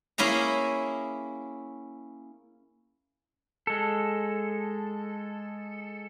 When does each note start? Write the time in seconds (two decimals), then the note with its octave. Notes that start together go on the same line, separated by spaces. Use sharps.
0.18 A#3 C#4 E4 G#4 A#5
3.67 G#3 A4